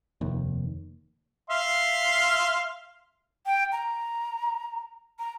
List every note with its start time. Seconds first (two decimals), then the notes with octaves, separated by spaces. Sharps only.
0.21 F1 D#2
1.50 E5 F5 C6
3.46 G5
3.72 A#5
5.19 A#5